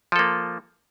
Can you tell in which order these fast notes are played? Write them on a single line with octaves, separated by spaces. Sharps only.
F3 A4 A#3